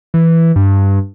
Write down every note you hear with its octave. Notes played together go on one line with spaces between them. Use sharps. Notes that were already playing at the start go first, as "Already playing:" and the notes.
E3
G2